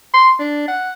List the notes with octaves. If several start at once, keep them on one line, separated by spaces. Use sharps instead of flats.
C6
D4
F#5